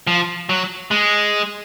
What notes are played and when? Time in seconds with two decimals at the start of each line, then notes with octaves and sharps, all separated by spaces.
0.07 F3
0.49 F#3
0.91 G#3